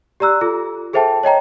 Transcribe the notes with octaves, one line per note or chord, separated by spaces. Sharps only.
G4 D5 A#5 E6 F#6
F4 A4
G#4 A4 C5 E5 G5 A5
C#5 D#5 G5 A#5